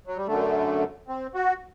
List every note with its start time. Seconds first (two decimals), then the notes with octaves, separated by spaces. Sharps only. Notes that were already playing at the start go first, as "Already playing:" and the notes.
0.07 F#3
0.17 G3
0.27 F#2 D3 A3
1.08 C4
1.35 F#4